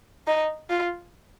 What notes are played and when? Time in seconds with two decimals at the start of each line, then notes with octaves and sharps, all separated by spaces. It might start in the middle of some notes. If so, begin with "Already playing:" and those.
0.27 D#4
0.69 F4